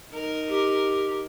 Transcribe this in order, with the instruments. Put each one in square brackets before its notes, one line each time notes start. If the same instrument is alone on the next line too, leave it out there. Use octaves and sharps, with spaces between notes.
[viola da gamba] D#4 A#4
[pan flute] G4